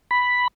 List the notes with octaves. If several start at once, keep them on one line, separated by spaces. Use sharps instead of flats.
B5